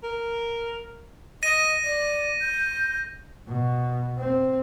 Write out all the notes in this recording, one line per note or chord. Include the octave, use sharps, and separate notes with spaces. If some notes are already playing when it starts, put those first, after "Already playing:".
A#4
D#5 A#6 D#7
D5
G6
B2
C4